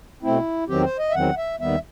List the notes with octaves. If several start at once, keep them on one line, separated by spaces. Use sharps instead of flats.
B2 A3 C4 E4
E2 D#3 F#3 C4 G4
C5
D#5
E5
E2 D#3 F#3 C4 F#5
E5
D#2 D#3 G3 B3 E5